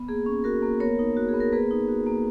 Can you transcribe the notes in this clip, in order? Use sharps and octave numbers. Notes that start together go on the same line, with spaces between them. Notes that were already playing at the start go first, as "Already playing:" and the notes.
Already playing: B3
A#3 G#4
C#4
F#4 A#4
A#3
B3 A#4 C#5
D#4
F#4
G#4
B3
A#4
A#3 G#4 B4
D#4
F#4
A#3